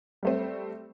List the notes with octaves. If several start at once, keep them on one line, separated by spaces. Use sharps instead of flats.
G3 A3 C4